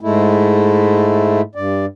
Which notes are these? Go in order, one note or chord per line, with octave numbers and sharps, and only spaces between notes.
G#2 G#3 A3 E4
G2 D5